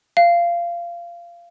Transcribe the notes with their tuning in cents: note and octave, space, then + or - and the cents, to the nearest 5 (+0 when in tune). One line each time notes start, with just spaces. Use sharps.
F5 -20